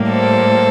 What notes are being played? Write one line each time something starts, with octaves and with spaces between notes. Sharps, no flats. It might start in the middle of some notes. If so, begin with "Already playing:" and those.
Already playing: A2 G3 A#3
A4 C5